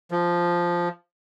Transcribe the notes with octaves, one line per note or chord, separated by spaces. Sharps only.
F3